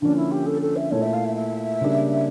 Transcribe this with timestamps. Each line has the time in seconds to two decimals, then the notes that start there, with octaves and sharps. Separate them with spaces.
0.01 D3 F3 A#3 C#4 D4
0.17 E4
0.31 G4
0.46 A4
0.61 A4
0.76 E5
0.91 A#2 A3 E4 C#5
1.02 E5
1.14 F5
1.25 E5
1.36 E5
1.81 C#3 G3 A#3 D4